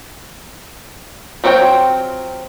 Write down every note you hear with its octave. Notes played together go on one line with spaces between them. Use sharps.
F#3 C4 F4 C#5 G5